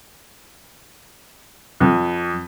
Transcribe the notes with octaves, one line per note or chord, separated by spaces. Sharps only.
F2